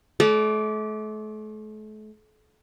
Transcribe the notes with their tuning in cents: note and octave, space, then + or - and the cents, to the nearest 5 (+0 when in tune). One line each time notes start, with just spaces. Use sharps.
A3 -40 D5 -15